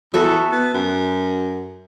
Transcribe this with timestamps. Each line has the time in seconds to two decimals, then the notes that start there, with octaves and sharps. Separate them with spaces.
0.14 E2 F#4 A4 E5
0.52 B3
0.74 F#2